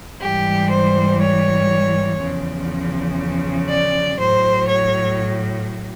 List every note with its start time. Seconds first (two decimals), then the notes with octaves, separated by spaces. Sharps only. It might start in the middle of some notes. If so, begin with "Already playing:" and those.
0.20 G#2 E3 G3 G4
0.70 C5
1.20 C#5
2.20 E2 C#3 F3
3.69 D5
4.18 A2 F#3 C5
4.68 C#5